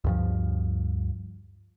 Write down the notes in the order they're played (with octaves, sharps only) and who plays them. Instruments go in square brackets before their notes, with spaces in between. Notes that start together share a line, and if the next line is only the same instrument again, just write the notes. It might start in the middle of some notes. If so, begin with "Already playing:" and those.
[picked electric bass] D2 G2 F3